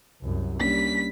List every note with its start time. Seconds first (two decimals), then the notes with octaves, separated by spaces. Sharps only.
0.21 C2 F#2
0.60 G3 A#3 C#4 D4 B6